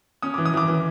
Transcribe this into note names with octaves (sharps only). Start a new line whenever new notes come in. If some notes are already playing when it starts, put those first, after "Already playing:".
C#4 D#6
E3 D6
D#6
E3 D6
E3